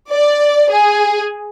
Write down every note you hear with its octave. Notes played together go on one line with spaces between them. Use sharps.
D5
G#4